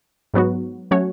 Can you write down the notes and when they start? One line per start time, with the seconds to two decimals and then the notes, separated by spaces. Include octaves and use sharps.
0.34 G#2 F#3 B3 F#4
0.91 F#3 A3 C#4 F#4 C#5